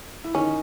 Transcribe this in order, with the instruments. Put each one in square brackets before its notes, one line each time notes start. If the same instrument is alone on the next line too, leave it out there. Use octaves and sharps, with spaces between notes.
[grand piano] E4
[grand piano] D#3 D#4 [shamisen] C#4